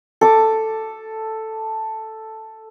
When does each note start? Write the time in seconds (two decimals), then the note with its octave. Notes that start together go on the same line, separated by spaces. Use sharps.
0.21 A4 D6